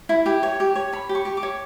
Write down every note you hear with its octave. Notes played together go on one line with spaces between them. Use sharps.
E4
G4 G5
C#5
G4
C#5
C#5 B5
G4
C#6
G4
D6
C#5